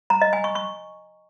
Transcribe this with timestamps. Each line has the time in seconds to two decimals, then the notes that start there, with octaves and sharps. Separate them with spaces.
0.10 A#5
0.21 D#5
0.33 G#5
0.44 C#6
0.55 C#6